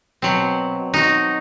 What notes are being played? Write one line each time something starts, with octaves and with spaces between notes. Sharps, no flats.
B2 F#3 C4
D#4 F#4